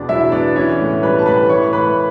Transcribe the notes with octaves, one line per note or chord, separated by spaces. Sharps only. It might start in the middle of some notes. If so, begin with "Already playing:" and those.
Already playing: E2 B2 D4 D5
F#3 E4 E5
B3 D4 D5
E3 C#4 C#5
A2
G3 B4 B5
A5
A2 B4 B5
E3 C#5 C#6
A2 B4 B5